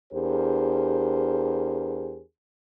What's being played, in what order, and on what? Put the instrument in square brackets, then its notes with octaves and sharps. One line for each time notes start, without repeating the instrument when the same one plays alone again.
[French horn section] E2 D4 G4 G#4 A#4 C5